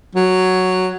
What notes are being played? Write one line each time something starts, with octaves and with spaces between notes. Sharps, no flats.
F#3